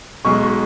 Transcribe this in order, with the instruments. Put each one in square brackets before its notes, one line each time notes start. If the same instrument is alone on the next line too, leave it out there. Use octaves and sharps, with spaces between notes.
[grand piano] B1 B2 G#3 C#6